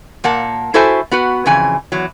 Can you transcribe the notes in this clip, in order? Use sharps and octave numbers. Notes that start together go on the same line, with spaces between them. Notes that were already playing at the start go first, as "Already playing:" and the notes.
A#2 A#3 F#5 A5
E4 F#4 A4 C5 E5 G#5
B3 F#4 B4
F2 C#3 E3 G#5
E2 F#3